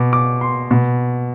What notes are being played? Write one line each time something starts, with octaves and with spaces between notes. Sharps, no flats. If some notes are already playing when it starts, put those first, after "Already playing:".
Already playing: B2 D6
D6
C6
B2